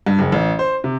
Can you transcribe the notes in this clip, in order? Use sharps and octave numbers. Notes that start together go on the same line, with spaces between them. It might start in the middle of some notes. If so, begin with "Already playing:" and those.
G2
F#1
A1
C5
C3